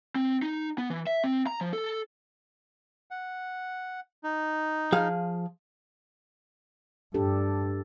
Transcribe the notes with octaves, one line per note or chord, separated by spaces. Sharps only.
C4
D#4
B3
E3
E5
C4
A#5
F3
A4
F#5
D#4
F3 G#4 F5
G2 D4 G4 A4